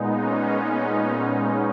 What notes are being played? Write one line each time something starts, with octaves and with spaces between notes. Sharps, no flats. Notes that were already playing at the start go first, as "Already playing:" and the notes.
Already playing: A#2 G#3 B3 D#4
C#4
D#4